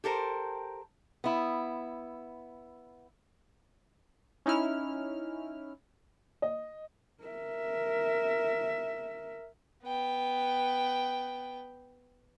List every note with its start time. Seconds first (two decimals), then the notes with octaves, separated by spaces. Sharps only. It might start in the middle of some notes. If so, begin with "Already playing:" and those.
0.04 G4 A4 A#4 C5
1.24 B3 E4
4.46 C#4 D#4 E4 F6
6.42 D#5
7.24 A#4 E5
9.83 B3 G5